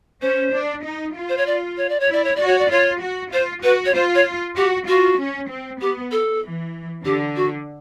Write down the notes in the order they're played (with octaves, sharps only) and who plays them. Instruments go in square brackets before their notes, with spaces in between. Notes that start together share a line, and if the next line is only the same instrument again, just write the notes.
[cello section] C#4 [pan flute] C5
[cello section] D4
D#4
F4
[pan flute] C5
C#5
D5
C#5
D5
C#5
[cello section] E4 [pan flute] D5
[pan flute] C#5
[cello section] F#4 [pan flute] D5
[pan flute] C#5
D5
[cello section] F4 [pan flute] C#5
[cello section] F#4
[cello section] F4 [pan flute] C5
[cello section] F#4 [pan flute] B4
[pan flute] C#5
[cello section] F4 [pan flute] C5
[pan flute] C#5
[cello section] F#4 [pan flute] G4
[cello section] F4 [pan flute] F#4
[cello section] C#4
C4
[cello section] B3 [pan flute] G4
[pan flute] A4
[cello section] E3
[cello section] D3 [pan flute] G4
[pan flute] F#4